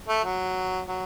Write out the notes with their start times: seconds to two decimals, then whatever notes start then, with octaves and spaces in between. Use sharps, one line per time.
0.08 A3
0.24 F#3
0.88 F#3